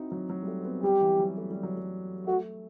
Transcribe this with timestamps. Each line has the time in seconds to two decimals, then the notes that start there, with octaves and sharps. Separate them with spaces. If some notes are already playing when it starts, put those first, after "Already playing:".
Already playing: C4 D#4 E4 F#4
0.12 F#3
0.30 F#3
0.43 G3
0.48 A3
0.60 C4
0.65 B3
0.83 G3 G4
1.01 E3
1.19 F#3
1.37 A3
1.51 G3
1.63 F#3
1.77 G3
2.27 A3 F#4